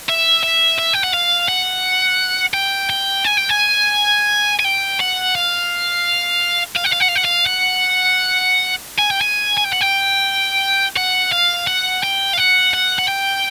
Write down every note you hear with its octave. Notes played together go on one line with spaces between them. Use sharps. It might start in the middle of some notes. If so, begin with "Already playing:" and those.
E5
E5
E5
G5
F#5
F5
F#5
G5
G5
G#5
G5
G#5
G#5
G5
F#5
F5
F5
F#5
F5
F#5
F5
F#5
F5
F#5
G#5
G5
G#5
G#5
G5
F#5
G5
F#5
F5
F#5
G5
F5
F#5
F#5
F#5
G5